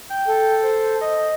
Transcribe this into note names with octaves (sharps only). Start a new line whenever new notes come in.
G5
A4
C5
D#5